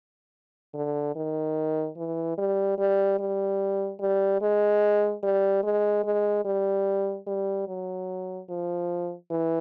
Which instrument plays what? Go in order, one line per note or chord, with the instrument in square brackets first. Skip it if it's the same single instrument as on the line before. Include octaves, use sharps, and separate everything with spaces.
[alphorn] D3
D#3
E3
G3
G3
G3
G3
G#3
G3
G#3
G#3
G3
G3
F#3
F3
E3